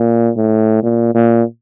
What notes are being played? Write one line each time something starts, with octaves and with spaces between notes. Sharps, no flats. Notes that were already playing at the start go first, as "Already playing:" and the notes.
Already playing: A#2
A2
A#2
A#2